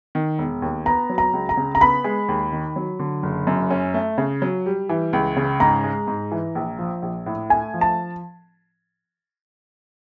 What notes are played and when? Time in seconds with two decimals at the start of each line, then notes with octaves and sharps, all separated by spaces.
0.15 D#3
0.38 E1
0.62 D#2
0.86 B3 A#5
1.10 F#3
1.18 A#5
1.33 C#2
1.49 A#5
1.57 C#3
1.75 A#5
1.81 B3 B5
2.04 G#3
2.28 D#2
2.52 D#3
2.76 F#3
2.99 D3
3.23 F#1
3.47 F#2
3.71 C#4
3.94 A3
4.18 C#3
4.42 F#3
4.66 G3
4.89 E3
5.13 C#2
5.37 C#3
5.60 G#2 A#5
5.84 G#3
6.07 G#2
6.32 E3
6.55 A#1
6.79 F3
7.02 A#1
7.26 A2
7.50 A3 G#5
7.74 F3
7.81 A5